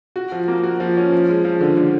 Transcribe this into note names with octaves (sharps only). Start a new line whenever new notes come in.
F#4
F3
A#3
F#4
F3
C#4
F3
G#3
F3
D3
D3